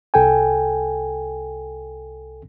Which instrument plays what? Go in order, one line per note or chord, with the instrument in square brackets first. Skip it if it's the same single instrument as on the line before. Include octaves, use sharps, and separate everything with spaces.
[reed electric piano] C2 A4 G5 G#5